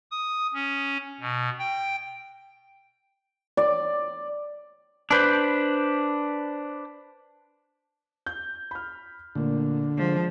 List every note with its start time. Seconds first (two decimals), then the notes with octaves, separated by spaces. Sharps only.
0.11 D#6
0.54 C#4
1.20 B2
1.59 G5
3.57 D5
5.11 D4 B4 C5
8.26 G6
8.71 B5 F6
9.35 A#2 D3 A3 A#3
9.98 F3 G#3